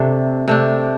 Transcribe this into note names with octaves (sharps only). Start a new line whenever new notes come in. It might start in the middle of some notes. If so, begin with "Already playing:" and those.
Already playing: C3 A3 D4
C3 A3 D4